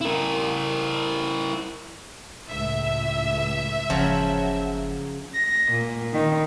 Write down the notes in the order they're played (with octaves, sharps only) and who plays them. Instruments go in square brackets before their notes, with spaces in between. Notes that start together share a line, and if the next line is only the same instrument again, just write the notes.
[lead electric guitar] E4 A#4
[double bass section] C#2 A2 [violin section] E5
[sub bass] F#1 [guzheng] C#3 F3 F#3
[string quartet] A#6
A#2
D#3